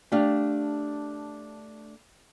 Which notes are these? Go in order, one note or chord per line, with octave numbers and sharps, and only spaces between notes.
A3 D4 G4 F5